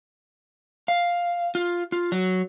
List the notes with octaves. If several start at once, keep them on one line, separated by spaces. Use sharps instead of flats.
F5
F4
F4
F#3